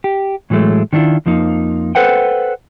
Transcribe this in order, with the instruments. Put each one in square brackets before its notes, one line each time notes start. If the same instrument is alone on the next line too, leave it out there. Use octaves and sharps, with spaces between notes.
[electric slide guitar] G4
A2 E3 F#3 G#3 A3
D#3 C#4 D4 E4 F4
F2 F3 A#3 D#4
A4 B4 C5 F#5 G5